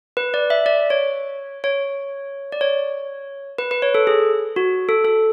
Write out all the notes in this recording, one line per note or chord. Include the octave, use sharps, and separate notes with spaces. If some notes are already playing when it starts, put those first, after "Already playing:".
B4
D5
E5
D5
C#5
C#5
D5
C#5
B4
B4
C#5
A4
G#4
F#4
A4
A4